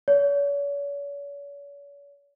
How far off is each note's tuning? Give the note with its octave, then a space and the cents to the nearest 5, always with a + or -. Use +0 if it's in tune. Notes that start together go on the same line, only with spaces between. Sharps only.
C#5 +40